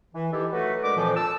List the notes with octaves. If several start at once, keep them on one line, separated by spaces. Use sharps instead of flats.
E3
D#3 E3 E4 G4 A4
F#3 A3 F#4 A4 B4
D3 G#3 A#4 D6
F2 A#2 E3 F3
A5 E6